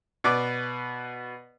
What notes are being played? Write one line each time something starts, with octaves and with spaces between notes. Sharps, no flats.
B2 B4 D5 D6